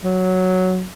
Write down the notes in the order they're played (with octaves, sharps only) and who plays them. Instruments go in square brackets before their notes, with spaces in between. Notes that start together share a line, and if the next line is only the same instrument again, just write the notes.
[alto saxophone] F#3